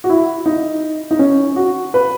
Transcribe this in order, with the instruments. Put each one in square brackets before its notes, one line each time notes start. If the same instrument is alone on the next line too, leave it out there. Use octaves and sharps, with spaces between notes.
[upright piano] F#4
E4
D#4
D#4
C#4
F#4
B4